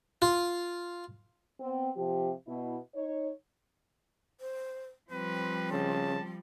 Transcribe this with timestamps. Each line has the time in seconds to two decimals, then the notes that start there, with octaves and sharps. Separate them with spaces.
0.22 F4
1.60 B3 C4
1.97 C3 F3 G4
2.48 B2 E4
2.96 D#4 C#5
4.40 C5
5.10 F3 G3 C4 B4
5.72 C#3 A5